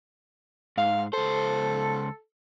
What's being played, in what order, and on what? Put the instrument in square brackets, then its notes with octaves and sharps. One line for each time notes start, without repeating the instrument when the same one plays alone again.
[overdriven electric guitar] G#2 [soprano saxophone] F5
[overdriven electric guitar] C#2 C5 [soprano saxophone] A4